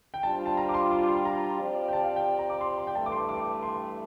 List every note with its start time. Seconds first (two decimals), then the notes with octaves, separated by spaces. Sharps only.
0.14 G5
0.23 G3 D4 F4 C5 A5
0.46 A5
0.57 A#5
0.69 D6
0.74 C6
0.91 D6
1.08 C6
1.25 A#5
1.59 F3 C4 G4 D5
1.88 G5
1.93 A5
2.04 F5
2.16 G5
2.39 A#5
2.50 D6
2.61 C6
2.78 C6
2.87 G5
2.95 G2 E3 A3 A5
3.06 D6
3.12 C6
3.29 D6
3.63 C6